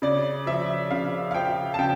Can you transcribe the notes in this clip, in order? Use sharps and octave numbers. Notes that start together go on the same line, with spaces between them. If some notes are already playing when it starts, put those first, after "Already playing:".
C#3 D5
F3 E5
C#3 F5
F5
F3 G5
A5
C#3 G5